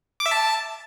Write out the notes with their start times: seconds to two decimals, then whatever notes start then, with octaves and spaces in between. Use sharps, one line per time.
0.20 D6
0.26 E5
0.31 A5